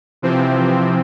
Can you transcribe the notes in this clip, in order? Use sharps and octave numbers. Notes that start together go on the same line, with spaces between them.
C3 E3 F3 C4